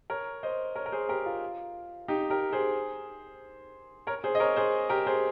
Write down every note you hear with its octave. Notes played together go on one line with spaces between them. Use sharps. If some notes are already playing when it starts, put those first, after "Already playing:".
A#4 C#5
C5 D#5
A#4 C#5
A#4
G#4 C5
G4 A#4
F4
D#4 G4
G4 A#4
G#4 C5
A#4 C#5
G#4 C5
D#5
A#4 C#5
G#4 C5
G4 A#4
G#4 C5